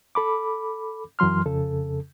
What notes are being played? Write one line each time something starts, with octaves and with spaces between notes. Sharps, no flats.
A4 B5 D6
F#2 E3 F#3 C6 F6
F2 C#3 A4